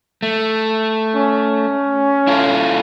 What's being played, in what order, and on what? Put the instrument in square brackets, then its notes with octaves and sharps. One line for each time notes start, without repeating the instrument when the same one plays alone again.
[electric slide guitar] A3
[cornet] C#4
[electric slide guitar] E4 F4 A4